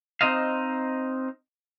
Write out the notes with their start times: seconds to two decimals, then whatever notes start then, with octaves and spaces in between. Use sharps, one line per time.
0.21 C4 D#4 C5 D#5 F5